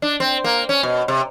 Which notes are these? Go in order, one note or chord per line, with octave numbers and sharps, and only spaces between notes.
D4
C4
A#3
C#4
B2
C3